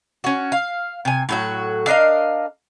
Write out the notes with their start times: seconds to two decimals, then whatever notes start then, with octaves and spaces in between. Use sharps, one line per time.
0.24 C#4 F#4
0.52 F5
1.05 C3 G#5
1.29 A2 F#3 F#4
1.87 D4 A#4 D#5 F5